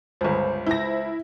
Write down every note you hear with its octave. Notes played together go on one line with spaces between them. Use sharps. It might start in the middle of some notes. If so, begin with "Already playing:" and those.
G1 C#2 C5
C#2 E4 A#6